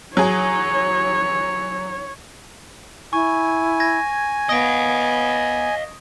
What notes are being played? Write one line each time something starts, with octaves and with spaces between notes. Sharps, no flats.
F#3 G#4 C#5
E4 G#5 C#6
G#6 A#6
B3 D#5 F5 D#6 A#6 D7